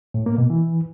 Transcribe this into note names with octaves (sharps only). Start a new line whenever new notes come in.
A2
A#3
B2
E3